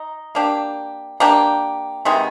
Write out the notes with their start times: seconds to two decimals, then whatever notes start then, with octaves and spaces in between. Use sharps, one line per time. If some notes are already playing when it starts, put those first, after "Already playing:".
Already playing: D#4
0.35 A#3 D4 G4
1.20 A#3 D4 G4
2.05 C3 D#3 G#3 B3